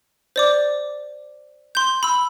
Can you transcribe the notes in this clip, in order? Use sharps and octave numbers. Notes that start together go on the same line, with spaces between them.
C5 D5 D6
C6 G6
B5 E6